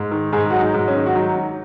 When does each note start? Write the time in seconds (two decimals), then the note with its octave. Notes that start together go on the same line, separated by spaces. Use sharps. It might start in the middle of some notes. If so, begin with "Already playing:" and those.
Already playing: G#2
0.11 D#3
0.33 G#2 G#4
0.50 F#3 F#4
0.60 D#4
0.74 G#2
0.88 C#4
0.94 D#3
1.06 F#4
1.15 F#3 D#4